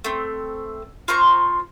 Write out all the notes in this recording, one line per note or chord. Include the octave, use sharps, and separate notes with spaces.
A3 C4
F4 C5 A#5 C#6